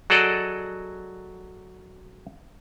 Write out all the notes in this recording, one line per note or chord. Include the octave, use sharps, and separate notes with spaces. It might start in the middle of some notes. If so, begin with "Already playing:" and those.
F#3 F#4 G#4 A4 D5 D#5